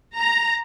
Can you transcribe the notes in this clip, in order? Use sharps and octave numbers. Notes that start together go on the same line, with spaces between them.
A#5